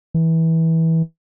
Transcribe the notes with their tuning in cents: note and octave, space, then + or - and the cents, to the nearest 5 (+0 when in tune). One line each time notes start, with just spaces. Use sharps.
E3 -20